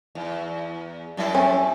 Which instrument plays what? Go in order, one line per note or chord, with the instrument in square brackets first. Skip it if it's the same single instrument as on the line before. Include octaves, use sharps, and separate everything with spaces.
[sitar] E2
F#2 G3 E4
[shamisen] C#4